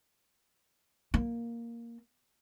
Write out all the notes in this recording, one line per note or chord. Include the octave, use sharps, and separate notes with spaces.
A#3